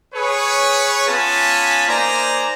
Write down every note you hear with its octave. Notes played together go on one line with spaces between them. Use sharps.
G#4 B4 C#5
B3 C#4 F4 G#5 A5 B5
A#3 D#4 C5 D5 G#5 A#5